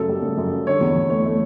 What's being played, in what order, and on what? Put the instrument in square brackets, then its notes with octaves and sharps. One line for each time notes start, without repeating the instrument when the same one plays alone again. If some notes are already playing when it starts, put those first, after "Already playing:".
Already playing: [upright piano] F#2 C#3 A4
G3
C#3
F#2
G3
D3 C#5
E2
E2
A3 C#5
A3